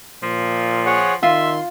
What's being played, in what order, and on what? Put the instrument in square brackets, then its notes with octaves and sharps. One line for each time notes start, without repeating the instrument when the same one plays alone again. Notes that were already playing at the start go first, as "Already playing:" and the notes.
[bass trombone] A#2 [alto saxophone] F3
[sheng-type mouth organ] G#4 C#5 F#5
[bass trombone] D#3 [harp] F4 [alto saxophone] E5 [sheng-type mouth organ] C6